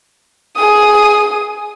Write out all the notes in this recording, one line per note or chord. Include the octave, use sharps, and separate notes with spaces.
G#4 D#6